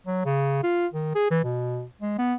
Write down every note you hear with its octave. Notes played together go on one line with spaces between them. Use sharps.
F#3
C#3
F4
D#3
G#4
E3
B2
G#3
B3